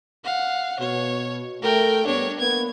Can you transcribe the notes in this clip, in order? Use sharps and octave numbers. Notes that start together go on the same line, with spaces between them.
F5 F#5
B2 C#5
A3 A#4 G5
G2 B3 D4 C#5
A#3 B3 G#6